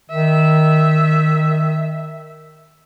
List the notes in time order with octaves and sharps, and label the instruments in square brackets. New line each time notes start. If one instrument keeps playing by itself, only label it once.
[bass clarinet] D#3 [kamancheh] E5